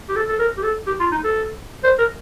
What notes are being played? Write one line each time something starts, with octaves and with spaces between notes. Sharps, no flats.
G4
A4
A4
A#4
G4
A4
G4
F4
D#4
A4
C5
A#4